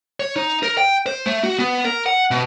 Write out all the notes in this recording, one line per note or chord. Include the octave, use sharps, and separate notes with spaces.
C#5
D#4
A#4
G5
C5
A3
F#4
B3
A#4
F#5
B2